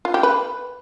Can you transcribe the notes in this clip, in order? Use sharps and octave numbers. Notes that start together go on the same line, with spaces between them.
F4
G4
B4